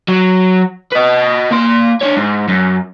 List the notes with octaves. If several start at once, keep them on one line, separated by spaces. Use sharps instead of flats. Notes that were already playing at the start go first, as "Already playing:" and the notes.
F#3
B4 D#5
A#3 C6
D4 C#5
G#2
F#2